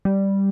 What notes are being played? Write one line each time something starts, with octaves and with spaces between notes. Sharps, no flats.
G3